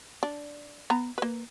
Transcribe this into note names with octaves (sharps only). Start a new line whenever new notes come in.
D4
B3 A#5
A#3 B4